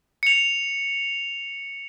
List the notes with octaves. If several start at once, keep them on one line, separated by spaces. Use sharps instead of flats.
C#7 F7